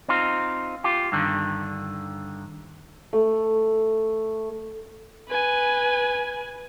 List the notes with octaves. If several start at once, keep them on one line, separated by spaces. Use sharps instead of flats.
C4 D#4 F4
F4 G4
G2 D3 D#3
A3
B4 G#5